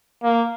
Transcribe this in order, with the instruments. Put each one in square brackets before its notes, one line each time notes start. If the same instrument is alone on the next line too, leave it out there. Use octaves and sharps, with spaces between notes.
[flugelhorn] A#3